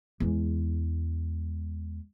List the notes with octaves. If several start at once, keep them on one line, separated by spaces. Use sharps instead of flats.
E2 G#3